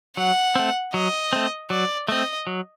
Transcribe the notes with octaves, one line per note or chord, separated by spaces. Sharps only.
F#3 F#5
A3 C4
F#3 D#5
A3 C4
F#3 D5
A3 C4 D#5
F#3